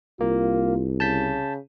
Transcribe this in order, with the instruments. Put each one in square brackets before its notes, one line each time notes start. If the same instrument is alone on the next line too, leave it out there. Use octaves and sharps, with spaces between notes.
[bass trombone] C2 [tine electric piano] A#3 [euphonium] F4
[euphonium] C#3 [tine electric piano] A5 G6 B6